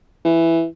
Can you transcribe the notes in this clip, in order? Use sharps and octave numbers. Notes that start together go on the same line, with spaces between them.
E3